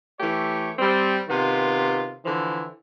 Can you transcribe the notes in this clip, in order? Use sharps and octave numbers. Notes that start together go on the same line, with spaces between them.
E3 A3 G4 C#5
G3 C4
C3 D#3 B3 F4
D3 E3 F3 E4